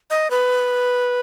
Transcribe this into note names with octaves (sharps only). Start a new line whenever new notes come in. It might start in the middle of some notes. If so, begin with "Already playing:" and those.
D#5
B4